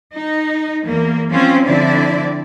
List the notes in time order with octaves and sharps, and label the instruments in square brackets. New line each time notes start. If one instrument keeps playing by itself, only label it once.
[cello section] D#4
E2 A#3
F3 C4 C#4 F4 C5
D3 F3 C4 E4 D5